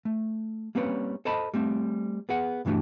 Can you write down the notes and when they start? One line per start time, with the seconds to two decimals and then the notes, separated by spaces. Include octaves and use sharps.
0.05 A3
0.75 G3 A#3 C4 C#4 B4 C#5
1.25 A4 C5 D#5 A5 B5
1.54 G3 A3 C4
2.29 B3 G#4 F#5
2.65 B1 G2 E3 A3 D4 F#4